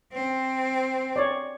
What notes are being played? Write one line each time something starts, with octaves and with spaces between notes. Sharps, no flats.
C4
C#5 D5